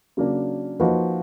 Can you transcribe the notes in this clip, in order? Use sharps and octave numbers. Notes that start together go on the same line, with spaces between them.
C#3 F#3 A#3 D4
F3 A#3 D#4 F#4 B4